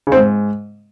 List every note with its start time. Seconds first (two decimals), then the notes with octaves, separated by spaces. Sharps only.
0.07 C#3
0.12 C4
0.17 G#2